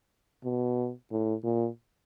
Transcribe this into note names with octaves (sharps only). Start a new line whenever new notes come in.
B2
A2
A#2